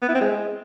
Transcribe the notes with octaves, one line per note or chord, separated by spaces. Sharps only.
B3
E4
C4
G#3